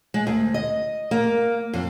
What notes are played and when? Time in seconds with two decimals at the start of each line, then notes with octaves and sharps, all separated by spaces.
0.14 G#3
0.27 D2
0.54 D#5
1.11 A#3
1.73 F2